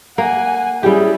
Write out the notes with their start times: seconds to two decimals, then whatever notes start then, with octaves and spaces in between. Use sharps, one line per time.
0.18 A#3 F#5 G#5
0.83 G3 C#4 E4 G4 G#4